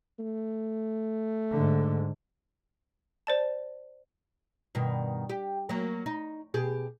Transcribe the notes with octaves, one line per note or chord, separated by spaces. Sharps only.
A3
G#2 D3
C5 D5 A5
G2 B2 D#3
G4
F#3 A#3
D#4
B2 G4 G#4